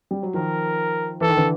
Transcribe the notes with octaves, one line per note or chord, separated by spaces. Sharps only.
G3
F#3
D#3 F3 A#4
E3 A4
D#3
D3 E3